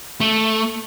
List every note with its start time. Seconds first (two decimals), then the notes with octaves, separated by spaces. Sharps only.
0.21 A3